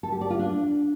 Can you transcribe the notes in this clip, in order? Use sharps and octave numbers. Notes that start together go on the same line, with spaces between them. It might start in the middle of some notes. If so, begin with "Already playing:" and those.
A4
G4
D5
F4
D4